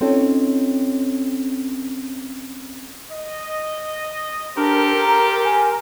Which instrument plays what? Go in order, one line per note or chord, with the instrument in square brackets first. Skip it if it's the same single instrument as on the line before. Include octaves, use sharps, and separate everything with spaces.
[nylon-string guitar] C4 C#4 D#4 F4 A4 C#5
[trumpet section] D#5
[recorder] D4 [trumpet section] G4 A4 C5 [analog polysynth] A#4
[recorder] A#5
G#5